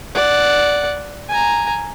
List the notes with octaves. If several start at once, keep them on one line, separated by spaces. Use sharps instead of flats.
D5 F#5
G#5 A#5